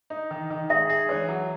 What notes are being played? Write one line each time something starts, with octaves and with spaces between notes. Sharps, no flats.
D#4
D#3
D#3
G#4 E5
G#4
E3 C#5
F#3